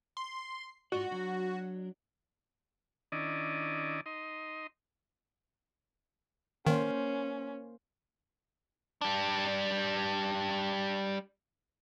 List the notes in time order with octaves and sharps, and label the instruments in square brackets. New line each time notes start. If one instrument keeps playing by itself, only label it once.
[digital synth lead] C6
[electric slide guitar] G#2 F4 D5 [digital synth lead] F#4
[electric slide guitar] F#3 D4
[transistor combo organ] D#3 C#4 D4 E4 D5 D#5
D#4 D#5 C6
[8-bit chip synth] D#3 [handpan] A#3 C5 F5 [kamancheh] C#4
[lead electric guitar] G3 D4